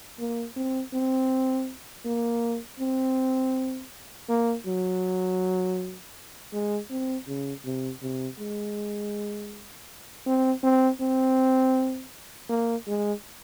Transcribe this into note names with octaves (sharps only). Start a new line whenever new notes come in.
A#3
C4
C4
A#3
C4
A#3
F#3
G#3
C4
C#3
C3
C3
G#3
C4
C4
C4
A#3
G#3